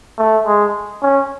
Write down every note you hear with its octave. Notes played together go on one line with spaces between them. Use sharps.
A3
G#3
C#4